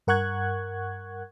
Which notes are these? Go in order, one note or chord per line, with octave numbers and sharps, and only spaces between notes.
G2 A#4 F#5 C#6 F#6 G#6